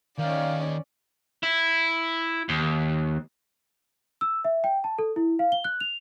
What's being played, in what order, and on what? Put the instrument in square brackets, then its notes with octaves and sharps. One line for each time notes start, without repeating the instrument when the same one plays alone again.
[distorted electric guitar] D#2 [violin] C#4 D5 [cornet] F5
[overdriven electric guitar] E4
D#2
[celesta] E6
E5
G5
A5
A4
E4
F5
G7
F#6
F7